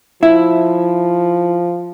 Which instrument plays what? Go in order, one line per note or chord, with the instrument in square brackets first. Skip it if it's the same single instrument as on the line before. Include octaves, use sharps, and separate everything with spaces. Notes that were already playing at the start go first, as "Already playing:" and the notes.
[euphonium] F3 [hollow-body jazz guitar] E4